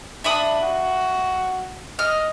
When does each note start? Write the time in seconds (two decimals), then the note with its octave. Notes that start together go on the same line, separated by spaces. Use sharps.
0.24 D4 E5 B5 D#6
0.61 F#4
1.99 D#5 F6